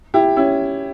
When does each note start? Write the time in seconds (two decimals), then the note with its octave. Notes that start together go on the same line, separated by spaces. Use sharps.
0.14 E4 G4
0.36 C#4 E4